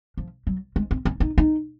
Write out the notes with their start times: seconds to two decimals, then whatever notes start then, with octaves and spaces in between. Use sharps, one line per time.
0.17 F3
0.47 F#3
0.76 G#3
0.91 C4
1.05 C#4
1.20 D#4
1.38 D#4